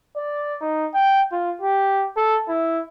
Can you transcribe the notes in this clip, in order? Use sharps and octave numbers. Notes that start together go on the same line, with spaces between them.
D5
D#4
G5
F4
G4
A4
E4